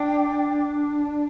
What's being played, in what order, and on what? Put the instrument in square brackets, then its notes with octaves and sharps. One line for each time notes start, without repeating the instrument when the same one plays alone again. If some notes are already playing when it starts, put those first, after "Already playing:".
Already playing: [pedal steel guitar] D4 [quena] G5